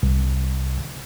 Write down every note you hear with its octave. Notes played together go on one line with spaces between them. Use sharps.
C2